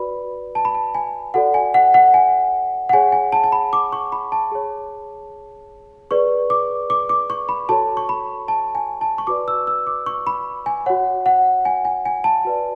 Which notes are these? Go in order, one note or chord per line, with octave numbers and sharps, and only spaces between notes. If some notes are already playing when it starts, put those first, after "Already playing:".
Already playing: F#4 B4 D5 B5
A5
B5
A5
G#5
F#4 A4 D5 F#5
G#5
F#5
F#5
G#5
F#5
G#4 C#5 G#5
G#5
A5
A5
B5
D6
C#6
B5
A5
G#4 C#5
G#4 B4 D5 C#6
D6
D6
D6
C#6
B5
F#4 A4 C#5 A5
C#6
B5
A5
G#5
A5
C#6
F#4 B4 D5 D6
E6
E6
D6
C#6
B5
G#5
F#4 C#5 F#5
F#5
G#5
G#5
G#5
A5
F#4 B4 D5